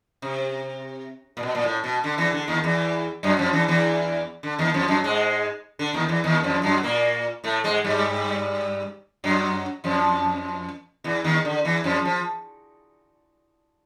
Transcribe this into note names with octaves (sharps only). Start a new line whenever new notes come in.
C3
A#2
B2
A#2
A2
B2
D3
E2 E3
D3
D#2 D#3
E2 E3
F#2 F#3
F2 F3
E2 E3
E2 E3
D3
D#2 D#3
F2 F3
F#2 F#3
G#2 G#3
D3
D#2 D#3
E2 E3
D#2 D#3
F2 F3
F#2 F#3
A#2 A#3
A2 A3
G#2 G#3
G2 G3
F#2 F#3
F2 F3
E2 E3
D#2 D#3
D3
E2 E3
F2 F3
F3